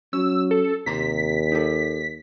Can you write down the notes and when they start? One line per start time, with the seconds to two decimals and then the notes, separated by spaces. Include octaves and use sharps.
0.13 F#3 C#4 E6
0.51 A4
0.86 D#2 C3 A#5 C6 B6
1.52 D#4 A4